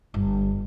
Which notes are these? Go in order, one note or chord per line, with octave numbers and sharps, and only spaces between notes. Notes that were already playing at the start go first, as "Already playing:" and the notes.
G1